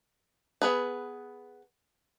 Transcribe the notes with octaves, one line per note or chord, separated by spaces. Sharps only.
B3 G#4 B4